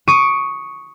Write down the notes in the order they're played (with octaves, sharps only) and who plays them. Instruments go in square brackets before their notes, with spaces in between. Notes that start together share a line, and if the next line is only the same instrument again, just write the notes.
[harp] C#6 D#6 D7 D#7